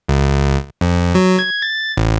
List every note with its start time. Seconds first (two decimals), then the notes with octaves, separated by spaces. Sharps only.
0.09 C#2
0.81 F2
1.15 F#3
1.39 G#6
1.62 A6
1.97 A1